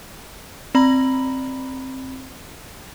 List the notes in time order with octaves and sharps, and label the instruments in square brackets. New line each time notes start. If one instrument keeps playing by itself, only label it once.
[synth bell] C4 D5 A#5 B5 F#7